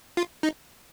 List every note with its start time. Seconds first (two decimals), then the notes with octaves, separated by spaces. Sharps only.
0.17 F4
0.43 D#4